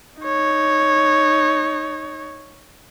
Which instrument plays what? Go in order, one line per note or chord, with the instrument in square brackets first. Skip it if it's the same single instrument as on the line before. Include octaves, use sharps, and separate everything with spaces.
[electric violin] D#4 C#5